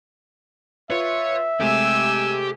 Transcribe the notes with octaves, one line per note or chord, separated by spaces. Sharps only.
F4 B4 C#5 E5
C3 G#3 A3 G4 G#5 E6